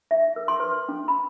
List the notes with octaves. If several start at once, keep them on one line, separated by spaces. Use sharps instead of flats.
E5
A#4
C6
B4
C#4
B5